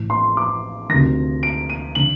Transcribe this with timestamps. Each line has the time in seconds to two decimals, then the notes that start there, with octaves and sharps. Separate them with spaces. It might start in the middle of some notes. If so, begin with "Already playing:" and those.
Already playing: A1 A2
0.10 C6
0.37 D6
0.89 D2 C3 D#3 A#6
1.43 D7
1.70 D#7
1.95 D3 F#7